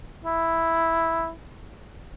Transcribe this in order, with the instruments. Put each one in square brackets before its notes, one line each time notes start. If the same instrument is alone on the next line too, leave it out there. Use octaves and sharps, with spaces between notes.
[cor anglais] E4